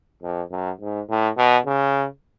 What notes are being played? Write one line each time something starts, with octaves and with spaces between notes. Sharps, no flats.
F2
F#2
G#2
A2
B2
C#3